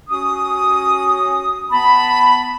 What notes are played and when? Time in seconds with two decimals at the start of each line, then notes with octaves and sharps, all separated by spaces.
0.10 C#4 F#4 D#6
1.71 B3 A5 B5